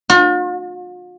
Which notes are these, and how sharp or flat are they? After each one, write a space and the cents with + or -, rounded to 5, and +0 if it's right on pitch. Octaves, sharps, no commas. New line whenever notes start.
F4 +45